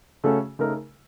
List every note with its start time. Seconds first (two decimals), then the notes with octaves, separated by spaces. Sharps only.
0.24 C#3 A3 C#4 F#4 A4
0.59 C#3 A3 D#4 A#4